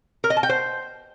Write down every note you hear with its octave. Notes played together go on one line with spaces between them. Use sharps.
A#4
D#5
A5
G5
C5